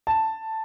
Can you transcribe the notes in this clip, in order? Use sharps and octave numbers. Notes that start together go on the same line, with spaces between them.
A5